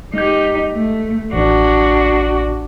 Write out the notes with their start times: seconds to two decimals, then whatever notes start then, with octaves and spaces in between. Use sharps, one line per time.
0.14 G#3 D#4 G4 G6
0.74 A3
1.33 A1 D4 F#4